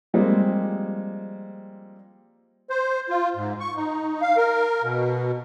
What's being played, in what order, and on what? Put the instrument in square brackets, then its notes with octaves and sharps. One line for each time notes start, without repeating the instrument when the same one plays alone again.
[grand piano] F3 G3 G#3 A#3 C4
[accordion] C5
F4
G#2
C#6
D#4
F5
A#4
B2